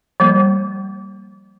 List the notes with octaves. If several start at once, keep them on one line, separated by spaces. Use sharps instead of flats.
F3 G3 A#3